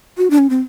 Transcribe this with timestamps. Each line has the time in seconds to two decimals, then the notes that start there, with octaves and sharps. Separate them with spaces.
0.18 F#4
0.30 D4
0.39 C#4
0.50 C4